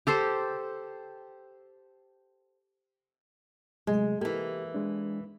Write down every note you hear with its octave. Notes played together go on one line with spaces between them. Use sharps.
G4 A4 C5
C3 F#3 G#3 A3
E3 A#3 G4 A4
G#3 D4